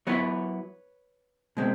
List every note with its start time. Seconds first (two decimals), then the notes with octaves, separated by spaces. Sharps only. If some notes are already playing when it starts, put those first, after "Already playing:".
0.07 F#3 B3 E4 B4 C#5
1.57 B2 G#3 C4